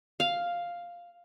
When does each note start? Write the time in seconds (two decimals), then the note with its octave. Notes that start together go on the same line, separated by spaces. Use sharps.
0.20 F5